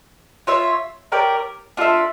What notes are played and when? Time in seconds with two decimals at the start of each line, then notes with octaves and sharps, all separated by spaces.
0.47 F4 C#5 E5
1.12 C#4 G4 A#4 D5
1.77 D4 F4 A4 E5